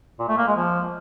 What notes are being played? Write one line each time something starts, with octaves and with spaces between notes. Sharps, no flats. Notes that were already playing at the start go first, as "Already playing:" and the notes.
A#2
A3
A#3
G#3
F3